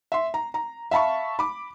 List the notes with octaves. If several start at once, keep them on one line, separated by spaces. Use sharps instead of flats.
E5 C6
A#5
A#5
E5 F5 A5 B5 C#6
B5 D6